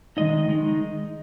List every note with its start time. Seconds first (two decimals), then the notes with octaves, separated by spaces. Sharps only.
0.17 D#3 G#3 D#4 D#5
0.48 D#3 G#3 D#4